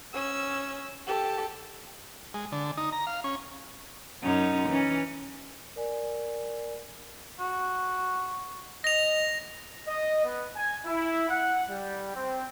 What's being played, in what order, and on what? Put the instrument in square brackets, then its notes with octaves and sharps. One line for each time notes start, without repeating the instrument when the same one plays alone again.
[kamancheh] C#4 E6
G4 A4
[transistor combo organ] G#3
D3
D#4
A#5
F5
C#4
[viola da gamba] F#2 C#4 D#4
E3 C#4
[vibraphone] A#4 D5 G#5
[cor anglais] F#4
[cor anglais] D#5 [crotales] A#6 F7
[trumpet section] D#5
B3
G#5
E4
F#5
G3
C4